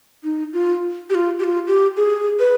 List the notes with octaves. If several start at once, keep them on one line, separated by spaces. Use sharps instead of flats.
D#4
F4
G4
F4
G4
F4
G4
G#4
B4